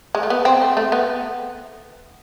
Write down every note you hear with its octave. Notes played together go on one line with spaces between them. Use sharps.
G#3
A3
B3
C4
A3
A3
B3